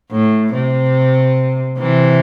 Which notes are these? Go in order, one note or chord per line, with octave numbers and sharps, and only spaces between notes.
A2
C3
C3 E3